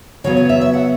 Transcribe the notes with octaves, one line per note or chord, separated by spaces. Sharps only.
C#3 F#3 B3 C#5
C#5
E5
E5
F#5